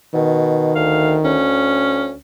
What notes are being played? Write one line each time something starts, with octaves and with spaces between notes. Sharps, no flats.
B2 D#3
D2 F5
D2 C#4